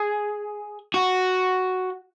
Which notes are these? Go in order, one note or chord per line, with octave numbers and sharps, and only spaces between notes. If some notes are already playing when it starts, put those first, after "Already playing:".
Already playing: G#4
F#4